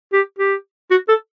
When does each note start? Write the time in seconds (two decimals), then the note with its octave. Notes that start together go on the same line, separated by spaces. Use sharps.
0.13 G4
0.39 G4
0.91 F#4
1.09 A4